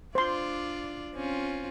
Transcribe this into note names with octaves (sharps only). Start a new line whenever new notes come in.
D4 F4 C5 D5 C6
C4 C#4 F4